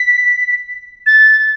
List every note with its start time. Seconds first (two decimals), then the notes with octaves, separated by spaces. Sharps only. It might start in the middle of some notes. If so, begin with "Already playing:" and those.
Already playing: B6
1.07 A6